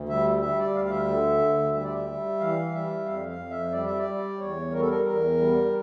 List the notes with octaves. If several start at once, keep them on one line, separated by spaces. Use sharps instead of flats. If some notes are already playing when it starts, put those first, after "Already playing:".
Already playing: D2
G3 E5
G3 E5
D5
D2 F5
F5
E5
D3
D2
G3 E5
D5
E5
G3
E3 F5
G3 E5
F2 F5
F5
F2
E5
G3 D5
E5
D5
G3
E2 C#5
G3 A#4
A4
A#4
E2 A#4
G3